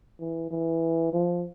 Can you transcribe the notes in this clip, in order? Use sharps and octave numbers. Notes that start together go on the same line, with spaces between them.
E3
E3
F3